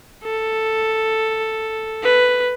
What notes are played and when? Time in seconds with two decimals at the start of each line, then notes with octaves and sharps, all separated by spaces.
0.24 A4
2.03 B4